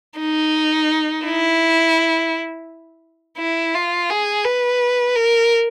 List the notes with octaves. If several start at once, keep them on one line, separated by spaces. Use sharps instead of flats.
D#4
E4
E4
F4
G#4
B4
A#4